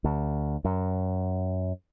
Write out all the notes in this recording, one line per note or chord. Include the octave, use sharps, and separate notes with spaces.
D2
F#2